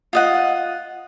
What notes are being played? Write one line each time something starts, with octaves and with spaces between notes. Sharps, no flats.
F4 D#5 F#5